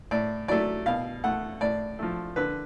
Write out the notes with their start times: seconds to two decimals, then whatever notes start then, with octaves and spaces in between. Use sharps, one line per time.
0.11 A2 D5
0.48 F#3 A3 D5
0.86 B2 F5
1.24 A3 F#5
1.61 A2 D5
1.99 F3 A3
2.36 D3 B4